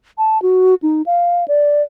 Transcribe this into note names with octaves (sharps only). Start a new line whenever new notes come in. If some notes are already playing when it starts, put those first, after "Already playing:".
A5
F#4
D#4
F5
D5